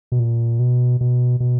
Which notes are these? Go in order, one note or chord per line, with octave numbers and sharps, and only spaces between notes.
B2
A#2
B2
B2
B2